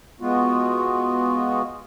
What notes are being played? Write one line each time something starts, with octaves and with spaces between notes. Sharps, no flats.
G#3 B3 F4 F#4